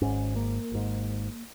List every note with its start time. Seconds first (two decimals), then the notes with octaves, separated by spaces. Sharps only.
0.02 G#1 G#2 C#4
0.36 A#3
0.72 G#1 G#2